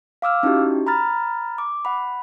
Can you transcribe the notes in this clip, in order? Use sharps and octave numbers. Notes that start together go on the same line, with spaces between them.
F5 D6 E6 F6
C#4 D#4 E4 F#4 G4
A#5 B5 F6 A6
D6
F#5 B5